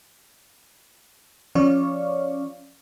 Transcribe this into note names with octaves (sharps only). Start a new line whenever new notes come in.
F3 C#4 C#5 D5 F5 C#6